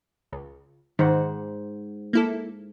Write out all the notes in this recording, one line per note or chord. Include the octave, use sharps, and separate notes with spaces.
C#2
G#2 D#3 C5 F#5
A#3 E4 A4